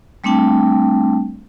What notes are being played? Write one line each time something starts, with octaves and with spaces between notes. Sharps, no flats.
G3 A3 C4 D4 G5 A5